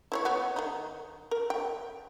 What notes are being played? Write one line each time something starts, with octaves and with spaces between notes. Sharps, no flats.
E4 C5 C#5
B3 F#4
D#3 D#4
A#4
G5